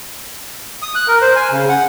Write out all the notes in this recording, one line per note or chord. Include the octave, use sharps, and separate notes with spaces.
D#6
F#6
A#4
C5
G#5
C#3
F#5